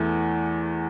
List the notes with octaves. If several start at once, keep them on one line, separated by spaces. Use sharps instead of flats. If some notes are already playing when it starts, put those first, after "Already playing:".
Already playing: E2 E3 A3